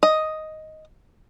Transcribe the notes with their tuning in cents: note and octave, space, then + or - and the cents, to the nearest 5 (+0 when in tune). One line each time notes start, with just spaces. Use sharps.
D#5 +5